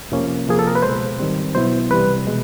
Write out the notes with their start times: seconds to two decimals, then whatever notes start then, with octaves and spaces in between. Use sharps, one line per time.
0.12 F2 C3 F3 A#3 C#4
0.47 C3 F3 A#3 G#4
0.59 A4
0.67 A#4
0.75 B4
0.82 C#2 B2 G#3 C5
1.19 G#2 D#3 G3 C4
1.55 B2 F#3 B3 E4 C5
1.90 C2 C3 E3 G3 B4
2.26 B2 G#3